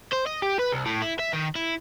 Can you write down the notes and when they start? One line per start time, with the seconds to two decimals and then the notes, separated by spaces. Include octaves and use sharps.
0.12 C5
0.26 D#5
0.42 G4
0.59 B4
0.73 C2
0.86 A2
1.02 E4
1.19 E5
1.33 D#3
1.55 E4